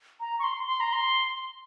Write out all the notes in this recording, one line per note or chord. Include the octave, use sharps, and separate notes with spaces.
A#5
C#6
C6
C6
A#5
C6